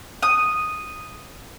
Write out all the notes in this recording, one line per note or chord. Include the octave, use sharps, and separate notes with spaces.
D#6